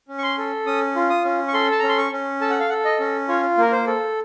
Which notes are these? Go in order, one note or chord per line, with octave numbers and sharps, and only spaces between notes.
C#4
C#6
C6
A4
C#4 D#6
F4
D#6
C#4
C#6
A4 C6
A5
C#4 A#5
C6
C#6
C#4
A4 A5
F#5
F5
A4 F#5
D#5
C#4
F4 C#5
A#3 A#4
C5
A4